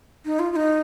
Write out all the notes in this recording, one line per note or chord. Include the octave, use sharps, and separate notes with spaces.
D#4
F4
F4
D#4